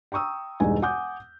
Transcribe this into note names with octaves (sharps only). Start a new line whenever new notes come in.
G5 A#5 C#6 D#6 E6
E1 E2 G2 G#3 D#4 G#5
F#5 G#5 D6 D#6 G6